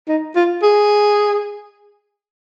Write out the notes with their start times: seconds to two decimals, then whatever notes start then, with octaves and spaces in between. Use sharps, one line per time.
0.08 D#4
0.36 F4
0.63 G#4